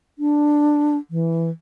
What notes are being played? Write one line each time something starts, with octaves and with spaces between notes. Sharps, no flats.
D4
E3